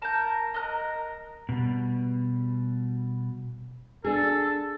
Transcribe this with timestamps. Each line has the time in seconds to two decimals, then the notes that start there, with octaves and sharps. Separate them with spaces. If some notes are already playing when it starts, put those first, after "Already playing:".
0.02 A#4 A5 G6
0.54 A#4 D#5 F#6
1.49 B2 G3
4.04 D4 G#4 A4